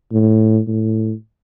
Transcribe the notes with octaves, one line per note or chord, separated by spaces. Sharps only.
A2
A2